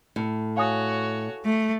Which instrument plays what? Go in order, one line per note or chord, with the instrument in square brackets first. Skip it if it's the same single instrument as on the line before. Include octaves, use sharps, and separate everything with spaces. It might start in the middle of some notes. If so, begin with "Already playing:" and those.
[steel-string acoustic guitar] A2
[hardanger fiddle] F#4 C#5 [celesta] F5 G#5 D#6
[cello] A3